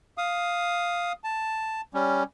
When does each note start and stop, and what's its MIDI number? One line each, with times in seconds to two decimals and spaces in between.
0.18 1.12 77
0.18 1.12 87
1.24 1.81 81
1.94 2.23 55
1.94 2.23 61